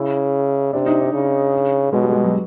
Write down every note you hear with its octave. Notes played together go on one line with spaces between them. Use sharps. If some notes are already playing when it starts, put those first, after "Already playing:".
Already playing: C#3 E4
C3 D4
D#4
D4
C#3
B2 G#3
G3
G#3
F#3